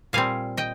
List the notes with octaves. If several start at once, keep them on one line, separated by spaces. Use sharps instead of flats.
A#2 G3 C4 F5 G#5
D#5 G5